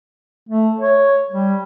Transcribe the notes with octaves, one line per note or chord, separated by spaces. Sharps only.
A3
C#5
G3